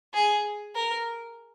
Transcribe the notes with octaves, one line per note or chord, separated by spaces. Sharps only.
G#4
A#4